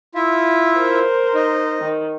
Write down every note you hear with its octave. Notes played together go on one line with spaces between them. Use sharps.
E4 F4 E5
A#4 C5
D#4
D#3